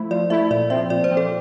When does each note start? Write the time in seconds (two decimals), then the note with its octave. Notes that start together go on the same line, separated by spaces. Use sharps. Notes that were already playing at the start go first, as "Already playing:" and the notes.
Already playing: F3 A3 E4
0.11 F3 D5
0.30 A3 E4 E5
0.50 A#2 D5
0.70 F3 C4 E5
0.90 A#2 D5
1.04 C5
1.10 F3 C4
1.17 A4